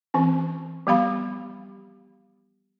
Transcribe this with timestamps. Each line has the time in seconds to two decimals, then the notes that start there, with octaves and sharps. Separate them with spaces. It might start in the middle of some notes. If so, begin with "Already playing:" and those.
0.14 E3 C4 C#4
0.87 F3 G3 B3 G4 F5 B5